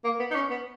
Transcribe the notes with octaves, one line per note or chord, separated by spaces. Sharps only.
A#3
B3
D#4
C#4
B3